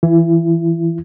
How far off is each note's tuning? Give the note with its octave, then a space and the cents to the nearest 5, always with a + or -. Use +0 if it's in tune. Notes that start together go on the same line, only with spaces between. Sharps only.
E3 +0 E4 +30